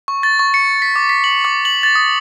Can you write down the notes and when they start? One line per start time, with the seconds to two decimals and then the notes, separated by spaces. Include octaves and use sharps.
0.08 C#6
0.23 A6
0.39 C#6
0.54 C#7
0.82 B6
0.96 D6
1.09 B6
1.24 F#7
1.45 D6
1.65 F#7
1.83 A6
1.95 D#6